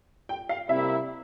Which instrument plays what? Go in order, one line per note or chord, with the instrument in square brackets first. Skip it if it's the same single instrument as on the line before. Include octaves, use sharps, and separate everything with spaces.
[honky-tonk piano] G5
F5
[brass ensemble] C3 G3 A#3 E4 [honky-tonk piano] E5